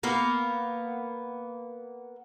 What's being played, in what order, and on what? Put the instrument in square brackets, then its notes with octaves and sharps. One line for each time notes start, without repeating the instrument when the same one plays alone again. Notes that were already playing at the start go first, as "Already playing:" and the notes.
[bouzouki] A#3 B3 A#4